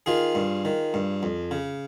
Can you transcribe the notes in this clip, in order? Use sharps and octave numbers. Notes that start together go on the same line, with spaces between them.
D#3 F4 G#4
G2
D#3
G2
F2
C#3